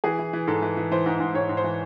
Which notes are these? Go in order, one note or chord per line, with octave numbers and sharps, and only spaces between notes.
E3 G#4
E3
E3
G#2 A4
E3
E3
E3 C5
G#2
G#2
G#2 C#5
G#2
C5
E3